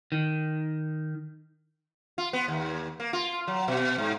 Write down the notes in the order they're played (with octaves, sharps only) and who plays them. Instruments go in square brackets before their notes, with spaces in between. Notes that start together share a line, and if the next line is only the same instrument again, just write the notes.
[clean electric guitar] D#3
[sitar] F4
B3
D#2
A#3
F4
F#3
B2
G#2